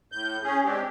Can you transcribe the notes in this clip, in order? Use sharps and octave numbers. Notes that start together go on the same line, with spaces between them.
A2 G6
C#4 G#4
G#3 C4 D4 G4